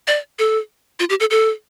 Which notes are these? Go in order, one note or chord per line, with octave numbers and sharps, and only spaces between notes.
D5
A4
F4
G4
A4
A4